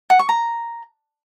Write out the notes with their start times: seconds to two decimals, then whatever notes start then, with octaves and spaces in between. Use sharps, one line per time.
0.10 F#5
0.19 C#6
0.29 A#5